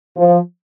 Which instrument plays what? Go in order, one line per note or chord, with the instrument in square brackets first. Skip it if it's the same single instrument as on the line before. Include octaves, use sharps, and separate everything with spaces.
[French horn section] F3